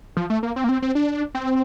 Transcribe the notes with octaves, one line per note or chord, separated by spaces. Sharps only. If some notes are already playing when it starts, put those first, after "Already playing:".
F3
A3
A#3
C4
A#3
C4
C4
D4
C4